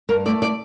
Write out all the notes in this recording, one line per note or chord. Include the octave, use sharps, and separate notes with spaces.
G2 A#4
A3 D5
D5